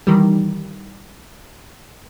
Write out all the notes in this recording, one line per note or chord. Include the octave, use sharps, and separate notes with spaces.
D#3 E3 G3